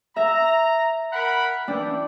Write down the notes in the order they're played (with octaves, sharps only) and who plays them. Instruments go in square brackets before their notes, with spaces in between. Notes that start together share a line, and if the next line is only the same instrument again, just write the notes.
[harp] E5 [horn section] A#5
[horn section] A#4 F#5 B5
[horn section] E3 G5 [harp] D4